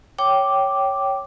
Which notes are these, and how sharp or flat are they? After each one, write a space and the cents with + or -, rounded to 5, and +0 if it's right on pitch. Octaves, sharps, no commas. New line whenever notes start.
C#5 +0 G5 -15 D6 +0